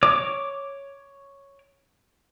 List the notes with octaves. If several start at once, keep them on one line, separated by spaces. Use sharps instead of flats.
C#5 D6